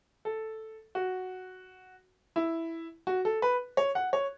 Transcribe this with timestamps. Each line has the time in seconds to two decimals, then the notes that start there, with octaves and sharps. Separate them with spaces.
0.25 A4
0.95 F#4
2.36 E4
3.07 F#4
3.25 A4
3.42 B4
3.77 C#5
3.95 F#5
4.13 C#5